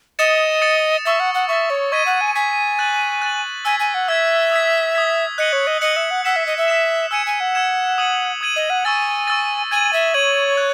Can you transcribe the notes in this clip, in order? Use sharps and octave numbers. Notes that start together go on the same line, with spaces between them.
D#5 D#6 A6 C#7 E7
D#6 A6 C#7 E7
E5 C#6 E6 A6
F#5
F#5
E5 C#6 E6 A6
C#5
D#5 C#6 G#6 B6 D#7
F#5
G#5
G#5 C#6 G#6 B6 D#7
F#6 A6 D#7 F#7
F#6 A6 D#7 F#7
G#5 E6 G#6 B6
G#5
F#5
E5 E6 G#6 B6
D#6 G#6 B6
D#6 G#6 B6
D#5 F#6 C#7 F#7
C#5
D#5
D#5 F#6 C#7 F#7
E5
F#5
F#5 E6 B6 E7
E5
D#5
E5
E6 B6 E7
G#5 E6 G#6 C#7 E7
G#5
F#5
E6 G#6 C#7 E7
D#6 G#6 D#7 F#7
D#6 G#6 D#7 F#7
D#5
F#5
G#5 C#6 E6 A6
C#6 E6 A6
G#5 G#6 D#7 F#7
E5
C#5 G#6 D#7 F#7
F#6